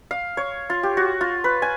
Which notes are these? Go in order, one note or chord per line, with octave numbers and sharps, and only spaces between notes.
F5
C#5
F4
G4
F#4
F4
B4
G#5